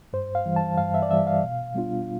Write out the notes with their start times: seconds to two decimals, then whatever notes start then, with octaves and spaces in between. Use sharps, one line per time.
0.13 G2 C5
0.35 F5
0.46 E3 G3
0.56 A5
0.78 G2 F5
0.94 E5
1.02 D5
1.11 E3 G3 E5
1.27 F5
1.43 B2
1.75 G3 B3 D4 F4